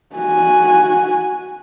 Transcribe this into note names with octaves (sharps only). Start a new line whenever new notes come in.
F#4 G#5